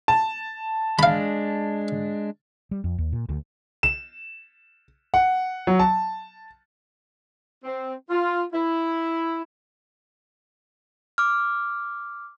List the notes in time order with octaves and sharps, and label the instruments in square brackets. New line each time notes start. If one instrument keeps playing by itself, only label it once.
[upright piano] A5
[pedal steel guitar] G#3 D4 [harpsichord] F5 B5
[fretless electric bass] G3
F2
D#2
A#2
D2
[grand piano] E7
F#5
F#3
A5
[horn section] C4
F4
E4
[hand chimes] D6 F6